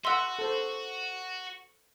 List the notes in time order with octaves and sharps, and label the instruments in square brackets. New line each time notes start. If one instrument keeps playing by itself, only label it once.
[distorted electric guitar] F#4 [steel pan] E5 F#5 [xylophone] C6 E6
[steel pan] A4 C5